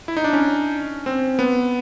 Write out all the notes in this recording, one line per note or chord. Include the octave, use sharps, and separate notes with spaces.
E4
D#4
D4
C#4
C4
B3